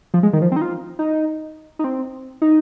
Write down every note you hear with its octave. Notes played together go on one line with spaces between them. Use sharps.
F3
G#3
D#3
F3
C4
D#4
F4
D#4
D#4
C4
D#4